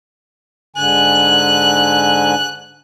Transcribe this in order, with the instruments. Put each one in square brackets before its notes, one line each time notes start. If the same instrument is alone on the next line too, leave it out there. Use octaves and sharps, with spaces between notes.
[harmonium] G#2 D3 G#5 [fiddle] F#6